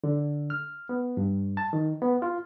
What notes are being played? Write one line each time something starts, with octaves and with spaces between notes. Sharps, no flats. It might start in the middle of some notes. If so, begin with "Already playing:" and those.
D3
F6
B3
G2
A5
D#3
B3
F4